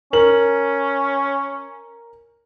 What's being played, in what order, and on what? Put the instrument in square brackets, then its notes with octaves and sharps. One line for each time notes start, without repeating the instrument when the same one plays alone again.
[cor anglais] C#4 [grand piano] A#4 F#7